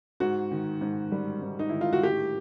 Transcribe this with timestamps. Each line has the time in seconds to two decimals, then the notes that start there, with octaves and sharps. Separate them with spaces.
0.20 G#2 F#4
0.51 D#3
0.81 G#2
1.12 G3
1.42 G#2
1.59 D#4
1.69 D#3 E4
1.81 F4
1.93 F#4
2.03 A2 G4